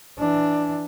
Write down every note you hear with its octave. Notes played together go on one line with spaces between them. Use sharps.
E3 D4